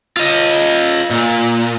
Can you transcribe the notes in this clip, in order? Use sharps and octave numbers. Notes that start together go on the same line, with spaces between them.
F4 D#5
A#2